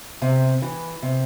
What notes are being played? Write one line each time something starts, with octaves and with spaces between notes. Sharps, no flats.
C3
E3
C3